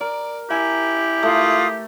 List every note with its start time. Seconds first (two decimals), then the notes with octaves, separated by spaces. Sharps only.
0.01 A#4 D5
0.51 E4 G4 G#5
1.23 A3 F4 D#6